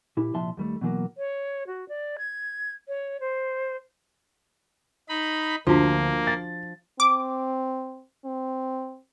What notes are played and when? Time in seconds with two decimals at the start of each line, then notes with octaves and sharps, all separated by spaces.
0.17 A#2 E4 G4
0.35 C2 A#2 F3 E5 A5 C6
0.57 D#2 G3 A3
0.81 B2 E3 F#3 A#3
1.18 C#5
1.67 F#4
1.89 D5
2.18 G#6
2.88 C#5
3.20 C5
5.09 D#4 B5
5.67 D2 F3 A#3 D4 F#4
6.27 A6
7.00 C4 D6
8.25 C4